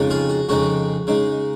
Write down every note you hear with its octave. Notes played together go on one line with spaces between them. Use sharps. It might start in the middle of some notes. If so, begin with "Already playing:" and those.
Already playing: F2 C#3 G#3 D#4
F4 G#4
F#4
F2 C#3 G#3 D#4 F#4
C#3 G#3 D#4